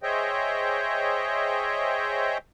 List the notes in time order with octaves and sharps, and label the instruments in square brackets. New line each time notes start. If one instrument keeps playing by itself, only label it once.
[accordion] G#4 C5 C#5 D#5 E5 G5